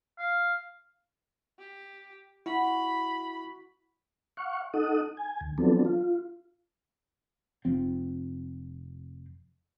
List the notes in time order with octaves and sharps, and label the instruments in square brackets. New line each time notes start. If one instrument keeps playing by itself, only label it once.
[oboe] F5
[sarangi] G4
[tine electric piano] E4 [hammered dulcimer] F#4 C6 [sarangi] B5
[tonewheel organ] F5 F#5 C#6
D#4 A4 F#5 D#6
G#5
D2
F3 F#3 B3 C4 D4 A4
F4
[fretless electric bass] F1 F3 C4